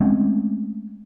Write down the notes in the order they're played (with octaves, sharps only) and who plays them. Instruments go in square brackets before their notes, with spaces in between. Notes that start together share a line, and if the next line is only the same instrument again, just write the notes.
[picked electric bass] G#3 A3 C4 C#4